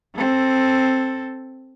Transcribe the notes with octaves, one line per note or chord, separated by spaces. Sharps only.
C4 A4